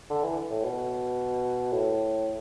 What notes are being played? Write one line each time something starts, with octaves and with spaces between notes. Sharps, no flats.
D3
E3
A2
B2
A2